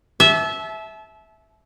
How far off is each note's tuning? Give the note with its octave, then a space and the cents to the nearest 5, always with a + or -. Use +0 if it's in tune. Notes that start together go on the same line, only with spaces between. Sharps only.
E5 -10 A5 -35